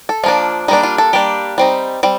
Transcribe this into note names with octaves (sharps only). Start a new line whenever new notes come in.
A4
F3 A#3 D4 F4
G3 A#3 D4 D#4
F4
A4
G3 A#3 D4 G4
G3 C4 D#4
G3 C4